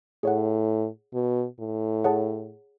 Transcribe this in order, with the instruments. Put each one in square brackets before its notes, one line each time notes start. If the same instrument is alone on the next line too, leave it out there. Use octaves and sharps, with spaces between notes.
[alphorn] A2 [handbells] G#4 C#5 F#5
[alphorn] B2
A2
[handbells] G#4 C#5 F#5 A5